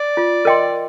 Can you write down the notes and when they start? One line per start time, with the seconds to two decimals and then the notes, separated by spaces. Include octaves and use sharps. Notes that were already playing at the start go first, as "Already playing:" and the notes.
Already playing: D5
0.17 F4
0.45 A#4 D#5 G5 C6